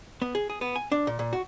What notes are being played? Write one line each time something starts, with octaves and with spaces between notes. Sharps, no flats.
B3
G#4
G#4
B3
G#5
D4
A#2
A#2
F#4